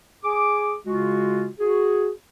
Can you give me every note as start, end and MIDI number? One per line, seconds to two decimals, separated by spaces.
0.24 0.75 68
0.24 0.75 86
0.86 1.48 49
0.86 1.48 56
0.86 1.48 65
0.86 1.48 66
1.60 2.10 66
1.60 2.10 68